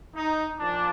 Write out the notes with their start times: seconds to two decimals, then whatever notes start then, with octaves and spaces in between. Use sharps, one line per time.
0.16 D#4
0.60 A#2 F3 D4